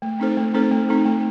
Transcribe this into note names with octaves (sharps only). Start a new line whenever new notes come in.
A3
C4 D#4 A4 C5
A3
C4 D#4 A4 C5
A3
C4 D#4 A4
A3